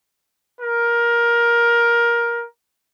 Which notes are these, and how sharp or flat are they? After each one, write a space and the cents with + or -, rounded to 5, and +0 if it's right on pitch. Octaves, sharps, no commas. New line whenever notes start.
A#4 +15